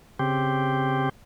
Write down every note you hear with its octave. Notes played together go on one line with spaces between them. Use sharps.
C#3 C4 G4